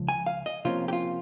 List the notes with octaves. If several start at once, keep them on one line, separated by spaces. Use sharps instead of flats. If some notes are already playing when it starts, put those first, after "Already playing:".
Already playing: C#2 F3
G#5
F5
D#5
C3 F3 A#3 C#4 F4
G4
F4